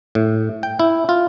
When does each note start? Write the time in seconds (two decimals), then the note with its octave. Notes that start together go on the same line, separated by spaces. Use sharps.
0.15 A2
0.63 G5
0.79 E4
1.09 F4